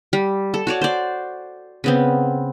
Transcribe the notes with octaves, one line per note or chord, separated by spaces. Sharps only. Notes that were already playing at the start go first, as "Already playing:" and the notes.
G3
A4
F#4 C#5 D5
C5 D5
C#3 B3 C4